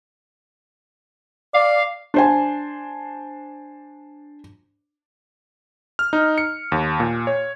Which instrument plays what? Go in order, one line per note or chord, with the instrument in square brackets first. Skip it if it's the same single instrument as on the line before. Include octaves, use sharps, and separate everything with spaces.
[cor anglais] D5 [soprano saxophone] F5
[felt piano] D4 C5 G#5
[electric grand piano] F6
D#4
C#7
D#2
A#2
C#5